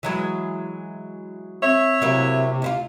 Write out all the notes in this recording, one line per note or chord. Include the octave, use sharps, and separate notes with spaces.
E3 F#3 G#3
C4 C#5 E5
C3 F#3 A#3 E4
D2 E4 F4